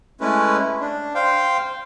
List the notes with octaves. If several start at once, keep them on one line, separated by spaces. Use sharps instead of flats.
G#3 A3 C#4 E4 B4
D4
C5 F5 G5